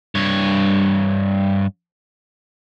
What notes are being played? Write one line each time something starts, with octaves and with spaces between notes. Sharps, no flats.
G2 C#5